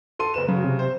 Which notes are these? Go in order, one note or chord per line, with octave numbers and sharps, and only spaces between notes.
A4 C6 D#7
F#1 B4 E7
C#3 F#3
C3
C5